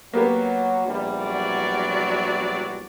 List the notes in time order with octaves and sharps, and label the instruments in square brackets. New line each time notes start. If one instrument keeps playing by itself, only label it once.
[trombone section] F#3 [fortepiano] A#3 B3 G4
[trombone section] A#1 E2 G3
[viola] F#3 D5